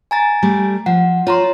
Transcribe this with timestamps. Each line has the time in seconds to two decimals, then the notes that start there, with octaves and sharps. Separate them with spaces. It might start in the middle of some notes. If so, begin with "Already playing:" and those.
0.11 G#5 A#5 A6
0.43 G3 A3
0.86 F3 F#5
1.27 F4 C#5 A#5 C6